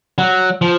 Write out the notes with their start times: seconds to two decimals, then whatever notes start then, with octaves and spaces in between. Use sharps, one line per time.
0.18 F#3
0.61 F3